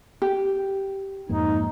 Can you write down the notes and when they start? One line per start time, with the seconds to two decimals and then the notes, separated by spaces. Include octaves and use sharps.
0.22 G4
1.29 F2 G#2 A#3 D#4